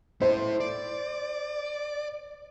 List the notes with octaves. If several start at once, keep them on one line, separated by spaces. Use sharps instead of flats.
E4 A4 C5
D5